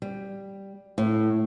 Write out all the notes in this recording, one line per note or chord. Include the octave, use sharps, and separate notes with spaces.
G3
A2